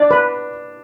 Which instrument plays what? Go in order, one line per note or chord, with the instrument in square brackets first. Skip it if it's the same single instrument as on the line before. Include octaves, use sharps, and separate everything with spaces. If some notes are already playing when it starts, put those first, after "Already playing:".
Already playing: [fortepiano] D4 [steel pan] D5
[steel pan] B4